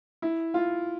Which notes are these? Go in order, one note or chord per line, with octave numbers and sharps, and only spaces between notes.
E4
F4